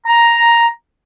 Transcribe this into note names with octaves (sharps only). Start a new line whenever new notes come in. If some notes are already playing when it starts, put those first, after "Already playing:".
A#5